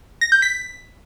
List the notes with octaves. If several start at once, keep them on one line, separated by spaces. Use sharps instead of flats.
A#6
G6
B6